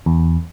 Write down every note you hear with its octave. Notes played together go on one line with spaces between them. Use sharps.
E2